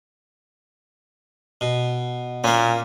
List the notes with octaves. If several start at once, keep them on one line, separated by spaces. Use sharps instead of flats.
B2
A#2 A#3 C#4